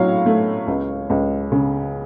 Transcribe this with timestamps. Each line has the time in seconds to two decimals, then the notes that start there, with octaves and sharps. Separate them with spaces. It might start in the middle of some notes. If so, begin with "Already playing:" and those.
Already playing: A2 F#3 C#5 F5
0.26 A3
0.67 C#2
1.10 C#2
1.52 C#3